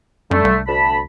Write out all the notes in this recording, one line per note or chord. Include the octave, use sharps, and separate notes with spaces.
F#2 D3 G3 A3
C2
D2 A5 B5